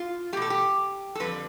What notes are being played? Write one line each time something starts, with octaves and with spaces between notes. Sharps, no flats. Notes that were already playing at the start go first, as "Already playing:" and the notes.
Already playing: F4
B2 A3 G4 A4
G4
A4
F2 D3 G3 B4